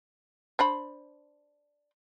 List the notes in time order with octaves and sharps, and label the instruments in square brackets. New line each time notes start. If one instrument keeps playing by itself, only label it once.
[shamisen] D4 C5 B5